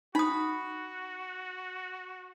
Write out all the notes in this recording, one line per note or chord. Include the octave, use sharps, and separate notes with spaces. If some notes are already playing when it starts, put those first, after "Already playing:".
D#4 F#4 B5 D#6